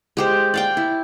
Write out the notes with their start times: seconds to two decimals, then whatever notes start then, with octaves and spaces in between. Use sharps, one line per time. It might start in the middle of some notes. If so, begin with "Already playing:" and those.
0.17 G#3 G4 C5
0.54 D5 F5 G5
0.77 E4